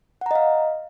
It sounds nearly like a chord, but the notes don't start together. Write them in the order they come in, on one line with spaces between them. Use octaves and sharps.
F#5 A#5 D#5 F5